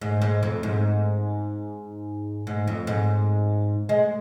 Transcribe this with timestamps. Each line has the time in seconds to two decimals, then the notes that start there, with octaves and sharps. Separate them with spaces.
0.01 G#2
0.22 G#2
0.43 F2
0.63 G#2
2.47 G#2
2.68 F2
2.87 G#2
3.89 G#3